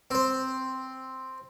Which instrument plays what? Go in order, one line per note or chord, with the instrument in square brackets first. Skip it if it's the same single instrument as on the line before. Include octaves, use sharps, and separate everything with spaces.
[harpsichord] C4 C5